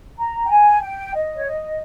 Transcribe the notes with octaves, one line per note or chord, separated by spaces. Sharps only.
A#5
G5
G#5
G5
D#5
C#5
D#5